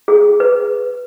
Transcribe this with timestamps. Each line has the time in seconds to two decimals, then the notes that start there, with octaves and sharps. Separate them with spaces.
0.08 G#4
0.40 B4